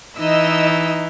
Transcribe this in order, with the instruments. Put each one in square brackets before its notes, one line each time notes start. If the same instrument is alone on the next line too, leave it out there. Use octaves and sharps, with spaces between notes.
[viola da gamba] E3 [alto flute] D#4 [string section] D#5 E6